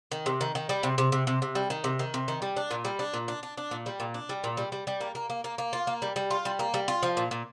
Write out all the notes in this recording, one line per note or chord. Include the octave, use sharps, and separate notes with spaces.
D#3
C3
D#3
D#3
G3
C3
C3
C3
C3
C3
G3
D#3
C3
D#3
C3
D#3
G3
D4
A#2
G3
D4
A#2
D4
D4
D4
A#2
G3
A#2
D4
G3
A#2
G3
G3
G3
A#3
A#3
A#3
A#3
A#3
F4
A#3
G3
G3
F4
G3
A#3
G3
F4
F3
A#2
A#2